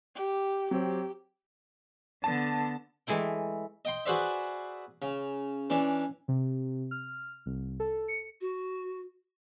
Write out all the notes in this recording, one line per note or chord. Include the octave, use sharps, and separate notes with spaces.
G4
F#3 C4 G4
D3 B3 A5
E3 G#3 A3 E4 G5
D#5 G5 C6
F#4 G#4 B4 C5 D5 E5
C#3
E3 C#4 D4
C3
F6
C2
A4
C#7
F#4